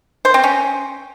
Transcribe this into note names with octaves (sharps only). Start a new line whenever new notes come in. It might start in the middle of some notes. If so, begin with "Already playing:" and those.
C5
C4
C#4